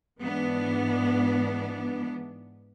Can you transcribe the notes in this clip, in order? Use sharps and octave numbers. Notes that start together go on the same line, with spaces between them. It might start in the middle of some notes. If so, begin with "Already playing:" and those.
G#2 E3 B3 D4